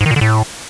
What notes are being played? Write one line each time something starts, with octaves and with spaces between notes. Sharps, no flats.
G#2
D#3
A#2
D3
A2